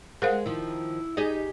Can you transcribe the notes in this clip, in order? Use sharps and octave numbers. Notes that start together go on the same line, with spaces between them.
G#3 A#4 C5 F5 F#5
D#3 F3 E4
D#4 G4 G#4 D#5